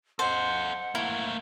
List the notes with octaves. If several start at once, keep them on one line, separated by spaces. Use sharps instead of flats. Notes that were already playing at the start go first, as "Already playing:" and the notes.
A4 C5 D#5 F#5
A3 A#3 E4